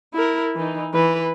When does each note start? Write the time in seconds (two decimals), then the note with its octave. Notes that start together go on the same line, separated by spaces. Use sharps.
0.14 E4 A#4
0.56 E3 D#4
0.94 E3 B4